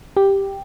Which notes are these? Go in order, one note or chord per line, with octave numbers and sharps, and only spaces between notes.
G4